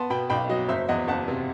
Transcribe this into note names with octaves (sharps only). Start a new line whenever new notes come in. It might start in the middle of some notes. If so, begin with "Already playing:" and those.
Already playing: B3 A5 C6
B2 G5 B5
B1 G5 B5
F#3 D#5
F#1 C5 E5
E2 D#5 F#5
F#1 F#5 A5
C3